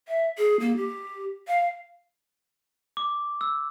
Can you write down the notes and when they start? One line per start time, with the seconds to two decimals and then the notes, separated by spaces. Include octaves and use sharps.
0.08 E5
0.38 G#4
0.60 A#3
0.77 G4
1.48 F5
2.97 D6
3.41 E6